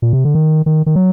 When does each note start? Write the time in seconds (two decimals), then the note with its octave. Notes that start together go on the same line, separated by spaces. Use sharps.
0.02 A#2
0.13 C3
0.25 D3
0.35 D#3
0.66 D#3
0.86 D#3
0.96 F#3